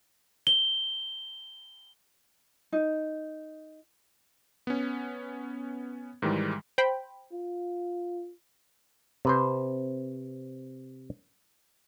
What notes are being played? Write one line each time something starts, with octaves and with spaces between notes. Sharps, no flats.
G7
D#4
B3 C#4
G#2 D#3 E3 G3 G#3
C5 G5 B5
F4
C3 B4 C5